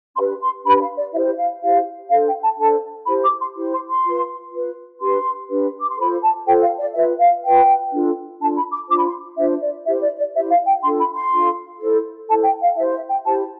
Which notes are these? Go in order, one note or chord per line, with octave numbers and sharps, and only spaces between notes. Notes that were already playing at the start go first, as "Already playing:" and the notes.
D4 G4 B4 C6
C6
D4 G4 B4 B5
F5
D5
E4 G4 C5 E5
F5
E4 G4 C5 F5
D4 A4 C5 F5
G5
A5
D4 A4 C5 A5
E4 G4 C5 B5
D6
C6
E4 G4 C5
C6
C6
F4 B4
F4 B4
D4 G4 B4 C6
D4 G4 B4
D6
C6
F4 A4 C5 B5
A5
F4 A4 C5 G5
F5
D5
F4 B4 E5
F5
F4 B4 G5
D4 F4 A4
D4 F4 A4 A5
B5
D6
D4 F4 C5 D6
B5
C6
D4 F4 C5 E5
D5
E4 G4 C5 E5
D5
D5
E4 G4 C5 E5
F5
G5
D4 F4 A4 C6
B5
C6
D4 F4 A4
E4 A4 C5
E4 A4 C5 A5
G5
F5
E4 G4 C5 E5
E5
G5
E4 G4 C5 A5